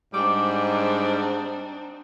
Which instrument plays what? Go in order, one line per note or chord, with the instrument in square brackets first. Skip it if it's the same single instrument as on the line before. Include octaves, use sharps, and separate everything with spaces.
[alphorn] G#2 [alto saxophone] G3 [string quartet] C4 D4 D#4 [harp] D6